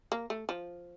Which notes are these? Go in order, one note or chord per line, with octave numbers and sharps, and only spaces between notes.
A#3
A3
F3